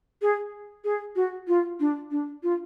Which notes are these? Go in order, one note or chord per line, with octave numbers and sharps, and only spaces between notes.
G#4
G#4
F#4
F4
D4
D4
F4